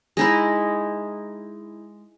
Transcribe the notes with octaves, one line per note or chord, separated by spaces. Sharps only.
G#3 D#4 E4